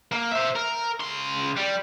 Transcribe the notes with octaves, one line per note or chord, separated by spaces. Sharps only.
A#3
C5 E5
A#4
C#3 C6
G3